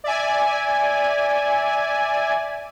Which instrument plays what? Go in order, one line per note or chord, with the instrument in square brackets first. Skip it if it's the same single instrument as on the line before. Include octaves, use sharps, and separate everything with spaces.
[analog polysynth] D5 E5 G#5